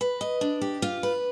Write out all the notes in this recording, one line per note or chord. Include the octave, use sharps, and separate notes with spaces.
B4
D#5
D4
G4
F4
B4